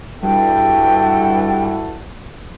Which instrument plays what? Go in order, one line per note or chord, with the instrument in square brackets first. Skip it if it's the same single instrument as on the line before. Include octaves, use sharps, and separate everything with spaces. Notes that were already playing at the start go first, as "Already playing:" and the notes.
[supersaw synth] G2 [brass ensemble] E4 F#4 A4 [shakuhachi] G5